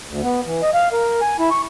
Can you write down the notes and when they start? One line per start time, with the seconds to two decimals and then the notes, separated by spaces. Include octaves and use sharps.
0.10 D2
0.23 B3
0.45 E3
0.62 D#5
0.74 F5
0.92 A#4
1.21 G#5
1.39 E4
1.51 C#6